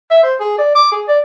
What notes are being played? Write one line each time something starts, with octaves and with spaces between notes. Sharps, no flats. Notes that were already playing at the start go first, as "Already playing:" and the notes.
E5
C5
G#4
D5
D6
G#4
D5